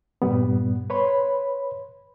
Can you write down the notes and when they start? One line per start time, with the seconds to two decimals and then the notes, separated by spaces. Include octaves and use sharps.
0.22 G2 A#2 G3 B3
0.90 B4 C#5 B5 C6